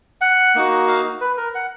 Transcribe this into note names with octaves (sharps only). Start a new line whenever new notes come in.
F#5
A#3 D#4 F#4
F5
B4
A#4
F#5